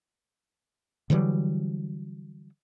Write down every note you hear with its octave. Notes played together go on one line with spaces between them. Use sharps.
D3 E3 F#3 G3